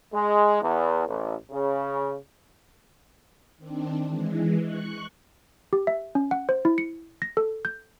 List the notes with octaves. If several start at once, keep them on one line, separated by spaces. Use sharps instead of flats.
G#3
E2
A1
C#3
D#3 C4 D4
E3 G#3
C#6 F#6
G4
E5
C#4
F#5
C5
E4
C#7
A#6
A4
G6